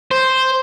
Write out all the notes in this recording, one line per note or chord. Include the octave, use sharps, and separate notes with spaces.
C5